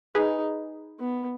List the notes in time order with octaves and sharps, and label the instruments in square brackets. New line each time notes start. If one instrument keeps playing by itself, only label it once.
[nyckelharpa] D#4 [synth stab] G#4 B4
[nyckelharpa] B3